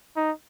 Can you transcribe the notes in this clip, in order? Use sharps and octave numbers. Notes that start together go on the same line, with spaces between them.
D#4